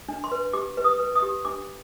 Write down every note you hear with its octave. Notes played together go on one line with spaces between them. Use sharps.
D4
C6
B4
G4 D6
B4
D#6
B4
D#6
G4
D4 D6